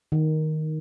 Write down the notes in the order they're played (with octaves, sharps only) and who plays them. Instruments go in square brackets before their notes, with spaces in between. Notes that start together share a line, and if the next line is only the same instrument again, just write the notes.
[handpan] D#3